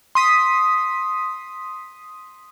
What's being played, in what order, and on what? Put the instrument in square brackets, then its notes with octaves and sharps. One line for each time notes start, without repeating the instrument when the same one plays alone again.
[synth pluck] C6 D#6 B6